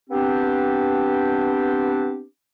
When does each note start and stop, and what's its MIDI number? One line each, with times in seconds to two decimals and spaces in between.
0.10 2.22 59
0.10 2.22 60
0.10 2.22 62
0.10 2.22 67